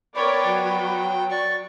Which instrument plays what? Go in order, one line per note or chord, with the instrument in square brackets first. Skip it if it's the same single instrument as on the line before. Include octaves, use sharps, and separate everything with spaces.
[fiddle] B3 G5 [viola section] A#4 C#5 D5 [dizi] B5
[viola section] F#3
[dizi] D5 [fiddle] C#6